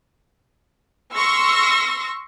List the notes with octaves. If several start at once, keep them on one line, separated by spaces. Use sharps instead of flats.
C6 C#6 E6 F6 A#6